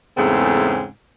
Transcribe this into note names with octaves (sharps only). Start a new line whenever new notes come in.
E2 G#2 C#3 A3 C4